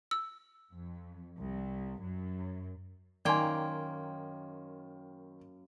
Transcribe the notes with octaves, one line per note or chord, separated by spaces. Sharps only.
E6
F2
C2
F#2
F#2 D#3 A#3 D5 G5 G#5 C6 G#6